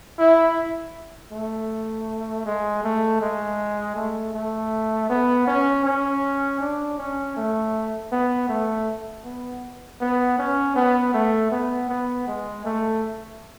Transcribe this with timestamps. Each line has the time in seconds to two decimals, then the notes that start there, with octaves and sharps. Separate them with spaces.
0.19 E4
1.32 A3
2.46 G#3
2.84 A3
3.21 G#3
3.96 A3
4.34 A3
5.10 B3
5.47 C#4
5.85 C#4
6.61 D4
6.98 C#4
7.37 A3
8.12 B3
8.49 A3
9.25 B3
10.01 B3
10.39 C#4
10.76 B3
11.14 A3
11.51 B3
11.89 B3
12.27 G#3
12.65 A3